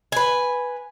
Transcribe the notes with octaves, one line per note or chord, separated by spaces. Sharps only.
B4 G#5